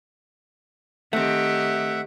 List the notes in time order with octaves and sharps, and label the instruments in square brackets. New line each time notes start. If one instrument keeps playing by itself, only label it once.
[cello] D#3 G4 [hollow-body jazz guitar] A3 C4 [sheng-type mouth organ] E5 F#5